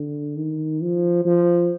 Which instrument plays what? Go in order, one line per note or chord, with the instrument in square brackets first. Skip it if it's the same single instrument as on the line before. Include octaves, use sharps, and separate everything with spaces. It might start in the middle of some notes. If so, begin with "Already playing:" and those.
Already playing: [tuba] D3
D#3
F3
F3